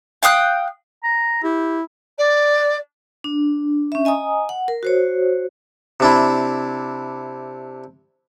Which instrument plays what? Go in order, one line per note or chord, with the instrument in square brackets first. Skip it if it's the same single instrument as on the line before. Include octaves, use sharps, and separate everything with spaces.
[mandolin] F5 G5 D#6 F#6
[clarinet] A#5
[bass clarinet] E4 [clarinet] G4
[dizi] D5
[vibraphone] D4
C#4 E5
D#5 G#5 A#5 D#6
F#5
A#4
F#4 C5 C#5
[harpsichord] C3 D4 E4